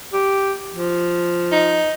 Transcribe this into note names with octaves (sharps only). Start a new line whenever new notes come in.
G4
F3
D#4